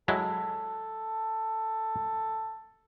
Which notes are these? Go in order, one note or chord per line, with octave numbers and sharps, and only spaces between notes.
F#3 G#3 E4 A4